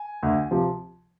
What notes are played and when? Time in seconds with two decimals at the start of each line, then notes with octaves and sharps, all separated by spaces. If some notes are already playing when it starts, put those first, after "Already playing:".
Already playing: G#5
0.23 D2
0.51 C3 F3